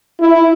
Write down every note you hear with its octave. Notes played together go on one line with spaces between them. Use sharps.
E4